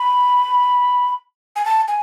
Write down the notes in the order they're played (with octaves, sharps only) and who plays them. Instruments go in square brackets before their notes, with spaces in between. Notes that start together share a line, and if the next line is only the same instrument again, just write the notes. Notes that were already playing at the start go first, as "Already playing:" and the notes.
Already playing: [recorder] B5
G#5
A5
G#5